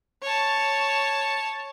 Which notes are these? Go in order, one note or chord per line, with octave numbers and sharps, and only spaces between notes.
C#5 A5